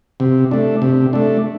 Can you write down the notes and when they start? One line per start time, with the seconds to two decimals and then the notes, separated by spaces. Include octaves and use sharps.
0.20 C3
0.51 A3 D4
0.82 C3
1.13 A3 D4